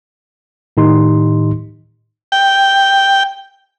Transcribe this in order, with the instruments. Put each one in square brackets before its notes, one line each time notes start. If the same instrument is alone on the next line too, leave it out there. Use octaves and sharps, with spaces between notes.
[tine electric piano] A2 D#3 D#4 G4 C6
[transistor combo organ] G5